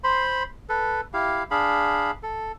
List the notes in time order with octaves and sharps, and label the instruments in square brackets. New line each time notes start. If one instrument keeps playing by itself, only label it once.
[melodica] C5 B5 C6
A4 B4
E4 G4 F5
D4 G#4 F5 B5
A4